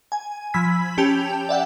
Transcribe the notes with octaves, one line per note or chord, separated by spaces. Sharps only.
G#5
F3 B5 E6 G#6 B6
C#4 G4 G5 A5 G6 F7
D5 E5 F#5 G5